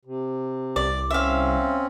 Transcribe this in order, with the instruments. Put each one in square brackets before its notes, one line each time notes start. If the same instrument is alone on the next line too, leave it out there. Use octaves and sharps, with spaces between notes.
[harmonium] C3
[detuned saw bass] C2 [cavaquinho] D5
[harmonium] C4 C#4 [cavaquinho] E5 F5